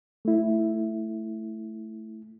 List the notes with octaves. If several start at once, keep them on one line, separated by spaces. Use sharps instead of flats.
A3 E4